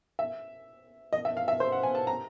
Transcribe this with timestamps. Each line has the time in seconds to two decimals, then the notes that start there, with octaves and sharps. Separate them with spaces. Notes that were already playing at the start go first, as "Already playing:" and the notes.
0.19 E5
1.13 D#5
1.25 E5
1.37 F5
1.48 E5
1.60 C5
1.72 F#5
1.83 G#5
1.95 A5
2.07 A#5